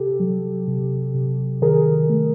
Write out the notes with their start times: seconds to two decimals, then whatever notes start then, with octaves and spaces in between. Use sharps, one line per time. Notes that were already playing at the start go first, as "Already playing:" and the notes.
Already playing: C3 G4 A4
0.20 F#3
0.68 C3
1.14 C3
1.62 D#3 G#4 A#4
2.10 A3